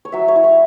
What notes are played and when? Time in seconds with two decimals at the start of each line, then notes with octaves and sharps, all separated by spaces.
0.05 C#5
0.12 F#3 E5
0.28 C#5
0.36 E4
0.44 C#5